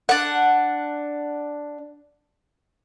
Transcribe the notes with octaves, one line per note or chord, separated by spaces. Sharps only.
D4 F#5